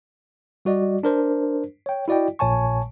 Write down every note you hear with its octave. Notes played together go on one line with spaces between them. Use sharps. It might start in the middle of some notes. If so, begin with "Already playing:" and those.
G3 F#4 D5 D#5
D4 A#4 C5
C#5 G5
E4 F#4 D5 D#5 G5
A#1 A#2 C#5 G#5 A5 C#6